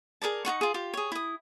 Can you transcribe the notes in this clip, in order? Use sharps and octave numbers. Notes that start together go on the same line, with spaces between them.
G#4 A#4 D5 A5
D#4 F4 F#5 C#6
F4 G#4
F4 G4
G#4 C#5
E4 D#6